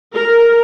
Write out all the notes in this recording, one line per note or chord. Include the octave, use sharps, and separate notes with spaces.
A#4